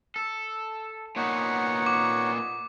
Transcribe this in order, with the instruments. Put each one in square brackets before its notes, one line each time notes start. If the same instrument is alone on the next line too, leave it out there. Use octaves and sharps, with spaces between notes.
[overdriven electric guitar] A4
[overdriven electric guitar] A#2 B3 [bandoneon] D#4 C#5 F#5
[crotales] D6